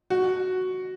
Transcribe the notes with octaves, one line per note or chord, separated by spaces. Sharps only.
F#4